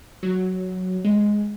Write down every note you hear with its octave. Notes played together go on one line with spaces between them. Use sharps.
F#3
G#3